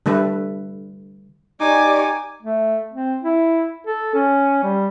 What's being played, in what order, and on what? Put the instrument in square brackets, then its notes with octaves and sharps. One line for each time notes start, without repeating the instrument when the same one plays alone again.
[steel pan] D3 G3 A3 A4 B4
[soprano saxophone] D#4 [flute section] G4 D5 C#6 [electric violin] G#5 D6
[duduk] A3
C4
E4
A4
C#4
G3